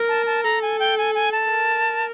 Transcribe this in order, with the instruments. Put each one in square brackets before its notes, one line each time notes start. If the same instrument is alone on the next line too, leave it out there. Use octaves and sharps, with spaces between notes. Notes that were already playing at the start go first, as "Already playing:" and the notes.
Already playing: [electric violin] A#4
[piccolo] A5
A5
[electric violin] A4 [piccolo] A#5
[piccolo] G#5
G5
G#5
G#5
A5
[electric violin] A#4